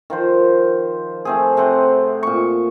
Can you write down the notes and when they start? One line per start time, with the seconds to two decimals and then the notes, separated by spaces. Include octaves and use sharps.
0.10 D#3 F3 C5
1.25 A3 C4 G#4
1.57 C3 C4 F#5 C6
2.23 A#2 C#6